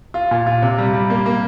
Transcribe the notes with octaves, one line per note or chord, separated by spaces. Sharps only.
F4
A#2
F4
C3
G3
G3
A#3
A#3